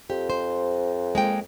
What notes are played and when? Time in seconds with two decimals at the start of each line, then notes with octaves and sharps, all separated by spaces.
0.10 F2 G4
0.30 C5
1.15 G#3 A#3 G5